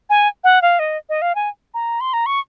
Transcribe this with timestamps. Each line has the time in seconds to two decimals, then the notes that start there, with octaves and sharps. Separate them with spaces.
0.10 G#5
0.44 F#5
0.62 F5
0.79 D#5
1.09 D#5
1.22 F5
1.35 G#5
1.74 A#5
2.00 C6
2.13 A#5
2.26 C#6